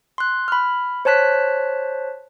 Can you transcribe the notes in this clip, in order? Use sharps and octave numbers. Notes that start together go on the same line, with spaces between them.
C6 F#6
B5 F6
C5 C#5 A5 F#6 B6